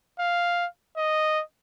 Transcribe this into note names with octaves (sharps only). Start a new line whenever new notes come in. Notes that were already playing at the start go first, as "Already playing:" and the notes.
F5
D#5